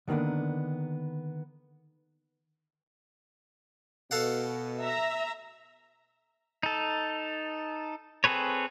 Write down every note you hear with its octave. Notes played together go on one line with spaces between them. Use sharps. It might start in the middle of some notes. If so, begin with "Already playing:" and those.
D3 D#3 A#3 B3 D4
B2 A4 F5 F#5
E5 A#5
D#4 A4
C4 G#4 A4 B4 C#5